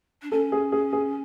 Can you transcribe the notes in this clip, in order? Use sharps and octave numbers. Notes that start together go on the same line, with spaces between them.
D4
C#4 A4
G#4
G#4
G#4